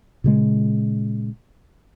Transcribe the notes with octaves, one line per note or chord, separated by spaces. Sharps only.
A#2 C#3 G#3